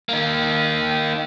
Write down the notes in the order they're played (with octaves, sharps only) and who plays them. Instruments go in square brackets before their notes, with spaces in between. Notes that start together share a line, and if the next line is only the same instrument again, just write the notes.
[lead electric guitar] A#3 D#4